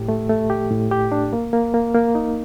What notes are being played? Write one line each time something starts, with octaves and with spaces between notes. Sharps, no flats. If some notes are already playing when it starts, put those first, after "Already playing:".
Already playing: A2 G4
A3
A3
G4
A2
G4
D4
A#3
A#3
A#3
A#3
D#4